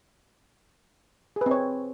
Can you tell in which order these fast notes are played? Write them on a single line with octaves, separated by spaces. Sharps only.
G#4 B4 C4 C#5